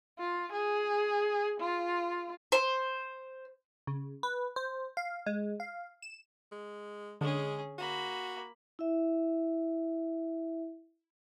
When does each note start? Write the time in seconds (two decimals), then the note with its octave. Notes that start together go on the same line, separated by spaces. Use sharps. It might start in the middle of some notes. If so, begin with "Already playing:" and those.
0.19 F4
0.53 G#4
1.61 F4
2.52 C5
3.87 C#3
4.23 B4
4.56 C5
4.97 F5
5.26 G#3
5.60 F5
6.02 E7
6.52 G#3
7.21 D3 G#3 C#4 G#4
7.78 A#3 F#4 B5
8.79 E4 E5